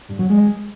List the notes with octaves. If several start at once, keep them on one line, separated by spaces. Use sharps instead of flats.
G2
F#3
G#3